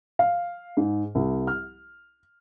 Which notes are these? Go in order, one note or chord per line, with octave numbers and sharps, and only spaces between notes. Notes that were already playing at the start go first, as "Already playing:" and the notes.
F5
G#2
C2
F6